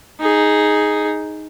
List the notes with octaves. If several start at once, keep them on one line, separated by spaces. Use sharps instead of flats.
D#4 G#4